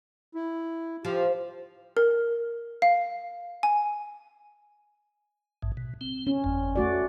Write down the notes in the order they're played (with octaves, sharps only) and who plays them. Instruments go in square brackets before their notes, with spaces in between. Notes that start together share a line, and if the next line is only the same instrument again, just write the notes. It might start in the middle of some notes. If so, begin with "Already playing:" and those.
[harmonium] E4
[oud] F3 [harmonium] F4 G4
[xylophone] A#4
F5
G#5
[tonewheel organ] A1 G#2
B2
C4
[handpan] C#4
[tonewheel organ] G1 F2
[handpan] A3 F#4 D5